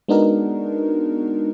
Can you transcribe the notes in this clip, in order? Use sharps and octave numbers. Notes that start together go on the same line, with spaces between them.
G#3 B3 D4 D#4 F#4 A#4